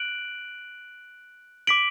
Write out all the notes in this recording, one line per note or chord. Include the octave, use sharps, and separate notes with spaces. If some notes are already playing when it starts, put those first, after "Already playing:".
Already playing: F#6 D7 F#7
D6 B6 D7 F#7